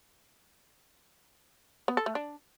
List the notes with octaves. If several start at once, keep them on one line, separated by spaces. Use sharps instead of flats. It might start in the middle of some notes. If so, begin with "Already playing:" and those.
B3
A4
A3
D4